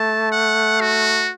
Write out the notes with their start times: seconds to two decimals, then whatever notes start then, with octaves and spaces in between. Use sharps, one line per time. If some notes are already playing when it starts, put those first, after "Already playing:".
Already playing: A3 A5
0.32 F#5
0.81 F#4